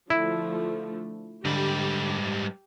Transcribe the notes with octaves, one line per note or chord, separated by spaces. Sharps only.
D3 F3 A3 E4
G#2 D3 G3 G4